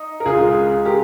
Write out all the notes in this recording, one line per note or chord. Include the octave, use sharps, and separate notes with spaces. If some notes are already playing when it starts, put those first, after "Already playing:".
Already playing: D#4
A#4
C#2 C#3 G#3 F4 G#4
C#3 G#3 G4 A#4